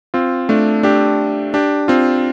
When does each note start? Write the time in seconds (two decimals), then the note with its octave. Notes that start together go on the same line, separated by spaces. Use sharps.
0.14 C4 F4
0.49 A3 D4
0.83 D4 G4
1.54 D4 G4
1.88 C4 F4